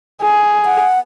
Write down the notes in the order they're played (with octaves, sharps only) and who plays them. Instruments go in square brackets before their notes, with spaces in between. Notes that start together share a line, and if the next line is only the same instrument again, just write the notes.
[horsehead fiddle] G#4
[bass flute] F#5